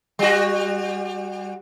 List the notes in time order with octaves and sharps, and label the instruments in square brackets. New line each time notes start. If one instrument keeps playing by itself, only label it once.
[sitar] G3 F#4